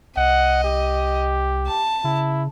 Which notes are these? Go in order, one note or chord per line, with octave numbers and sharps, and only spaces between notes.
C2 D#5 F#5
G4
A5
C#3 E4